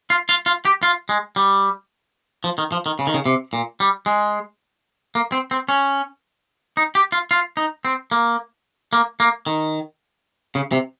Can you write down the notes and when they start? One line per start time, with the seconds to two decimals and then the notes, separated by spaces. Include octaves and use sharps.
0.10 F4
0.29 F4
0.46 F4
0.65 G4
0.83 F4
1.09 G#3
1.36 G3
2.44 F3
2.58 D#3
2.72 F3
2.86 D#3
2.99 C#3
3.07 D#3
3.14 C#3
3.26 C3
3.53 A#2
3.80 G3
4.06 G#3
5.15 A#3
5.32 C4
5.51 C4
5.69 C#4
6.77 D#4
6.95 G4
7.12 F4
7.31 F4
7.57 D#4
7.85 C4
8.11 A#3
8.93 A#3
9.20 A#3
9.47 D#3
10.55 C#3
10.72 C3